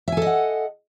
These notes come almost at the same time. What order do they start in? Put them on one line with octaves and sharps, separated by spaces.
E5 G#5 A4 D#5 F#5